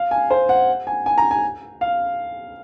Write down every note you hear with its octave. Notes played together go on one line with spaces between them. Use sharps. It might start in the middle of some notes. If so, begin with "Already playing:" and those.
Already playing: F5
G#5
C5
F#5
G#5
G#5
A#5
G#5
F5